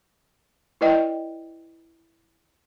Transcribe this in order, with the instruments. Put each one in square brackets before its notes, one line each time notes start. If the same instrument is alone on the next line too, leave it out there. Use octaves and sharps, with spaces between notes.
[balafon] E4 B4 D5 D#5 G5